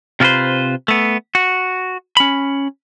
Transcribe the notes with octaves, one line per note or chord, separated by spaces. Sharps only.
C3 F4 F#4 B4 C5
A3 B3
F#4
C#4 B5